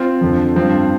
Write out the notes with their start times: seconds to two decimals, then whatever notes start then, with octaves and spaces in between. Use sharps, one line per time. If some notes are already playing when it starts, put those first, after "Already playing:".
Already playing: C4 F4
0.21 F2 D3 F3
0.56 G2 F3 C4